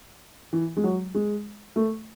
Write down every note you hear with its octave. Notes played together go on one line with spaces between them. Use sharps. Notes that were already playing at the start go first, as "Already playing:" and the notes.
E3
G#3
F#3
G#3
A3